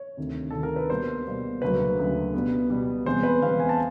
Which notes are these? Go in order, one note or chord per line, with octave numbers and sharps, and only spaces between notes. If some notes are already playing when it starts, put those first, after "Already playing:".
Already playing: C#5
D2 C3 D#3
D2 C3 D#3 A4
A#4
B4
B2 G3 A#3 C5
B2 G3 A#3
D2 C#3 F#3 A#3 B4
D2 C#3 F#3 A#3
B2 G3 B3
B2 G3 B3
E2 B2 G#3 C4 C5
B4
E2 B2 G#3 C4 F5
G#5
A5